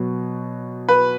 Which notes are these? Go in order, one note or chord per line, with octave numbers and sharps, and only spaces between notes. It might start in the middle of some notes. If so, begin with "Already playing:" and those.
Already playing: B2 F#3 B3
B4